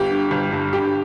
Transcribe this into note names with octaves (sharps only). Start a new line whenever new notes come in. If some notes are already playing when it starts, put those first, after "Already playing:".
Already playing: G1 G4
D3
G1
G2
D3 G4